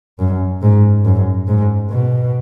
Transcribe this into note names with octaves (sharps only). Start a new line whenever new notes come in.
F#2
G#2
F#2
G#2
B2